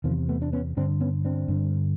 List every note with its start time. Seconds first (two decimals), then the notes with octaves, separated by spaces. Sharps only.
0.04 E2 C3 D#3 F3
0.29 A3 B3
0.42 D4
0.53 B3 C#4
0.77 G2 D3 C4 D4
1.01 B3 C#4
1.25 C4 D4
1.48 G2 D3